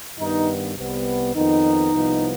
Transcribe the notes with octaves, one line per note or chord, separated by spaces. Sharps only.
G2 D#3 B3 D#4
C2 C3 G3 B3
F2 D#3 B3 D#4
C2 C3 F3 B3